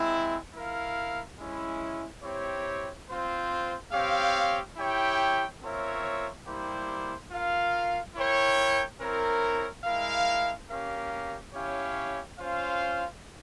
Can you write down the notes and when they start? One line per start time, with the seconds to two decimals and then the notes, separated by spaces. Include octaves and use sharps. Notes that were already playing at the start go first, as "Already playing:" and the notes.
Already playing: G#3 C4 E4
0.54 E4 A#4 F5
1.38 G#3 C#4 E4
2.23 C4 E4 G4 C#5
3.08 C4 F4 C5
3.93 C4 G4 C#5 F5
4.77 E4 G4 C#5 G5
5.62 C4 F4 A#4 C#5 E5
6.46 G3 A#3 E4 G4 C5
7.31 F4 A#4 F5
8.15 E4 A#4 C#5 G5
9.00 C4 E4 A#4 C#5
9.85 G#3 E4 A#4 F5
10.70 A#3 C#4 G4 A#4 F5
11.54 C#4 E4 G4 C#5 F5
12.39 C#4 F4 C5 F5